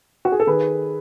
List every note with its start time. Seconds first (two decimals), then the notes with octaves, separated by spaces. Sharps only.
0.25 F#4
0.32 G#4
0.40 A4
0.47 D#3 G#4 B4